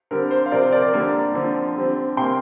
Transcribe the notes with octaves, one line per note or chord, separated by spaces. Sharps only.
D3 G3 C4 A#4
C5
F5
C3 F3 C4 A#4 D5
C5
A#4 D5
A#4 D5
D3 G3 A#3
D3 F3 C4
D3 G3 C4
C3 A#3 G5 C6